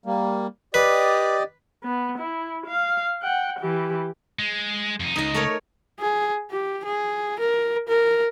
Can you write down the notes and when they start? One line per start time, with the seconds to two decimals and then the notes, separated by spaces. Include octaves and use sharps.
0.06 G3 A#3
0.74 G4 B4 D5 D#5
1.83 B3
2.18 E4
2.67 F5
3.22 F#5 G5
3.59 E3 G4
4.39 G#3
5.00 F2 D#4
5.16 C#2 D#4 D#5
5.34 A3 A#4 C#5
6.00 G#4
6.51 G4
6.85 G#4
7.39 A#4
7.88 A#4